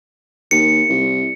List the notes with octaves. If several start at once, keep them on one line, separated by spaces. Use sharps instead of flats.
D#2 C#7
C2